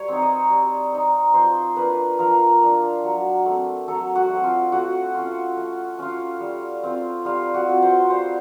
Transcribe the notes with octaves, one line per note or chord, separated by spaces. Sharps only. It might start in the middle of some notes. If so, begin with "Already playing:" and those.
Already playing: G3 C#5
C4 D#4
D#5
G3
C4 D#4
F3 C5
A#3 D4 F4 B4
F3 A#4
A#3 D4 F4
F#3
A3 C4
F#3 A4
F#4
A3 C4
F4
A3 F#4
C#4 F4
A3
C#4 F4
G3
C4 F4
G3 F4
F#4
C4 F4
C5
G3 C5